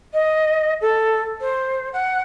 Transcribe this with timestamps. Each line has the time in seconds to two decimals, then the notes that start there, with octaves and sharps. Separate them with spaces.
0.14 D#5
0.81 A4
1.41 C5
1.93 F#5